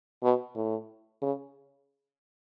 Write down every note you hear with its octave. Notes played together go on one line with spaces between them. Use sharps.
B2
A2
C#3